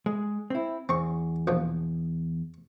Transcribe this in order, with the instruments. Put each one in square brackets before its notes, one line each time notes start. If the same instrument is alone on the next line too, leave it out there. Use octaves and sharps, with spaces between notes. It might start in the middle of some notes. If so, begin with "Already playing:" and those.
[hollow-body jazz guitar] G#3
C4 E4
[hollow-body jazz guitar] E2 [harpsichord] C4 C#6
[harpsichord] A#1 B2 F3